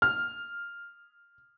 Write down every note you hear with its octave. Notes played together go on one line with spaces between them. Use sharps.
F6